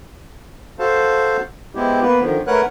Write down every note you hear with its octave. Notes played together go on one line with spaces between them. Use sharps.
F#4 A4 C5 F5 A5
G#3 B3 C4 E4 G4
A#3 B3 B4
D3 D#3 F3
A3 A#4 B4 C#5 F#5 F#6